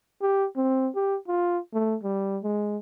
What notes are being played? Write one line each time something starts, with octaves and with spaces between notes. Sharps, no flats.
G4
C4
G4
F4
A3
G3
G#3